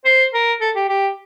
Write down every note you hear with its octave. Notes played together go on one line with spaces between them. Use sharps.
C5
A#4
A4
G4
G4